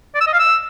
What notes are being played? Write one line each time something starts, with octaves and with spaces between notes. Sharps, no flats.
D5
E6
D#5
F5
E6